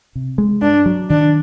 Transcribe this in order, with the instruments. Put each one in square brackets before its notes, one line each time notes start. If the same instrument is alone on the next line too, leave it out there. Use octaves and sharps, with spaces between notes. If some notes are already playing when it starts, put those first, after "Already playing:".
[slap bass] C3
G#3
[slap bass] G2 [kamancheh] D4
[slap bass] F#3
[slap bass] D#3 [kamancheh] D4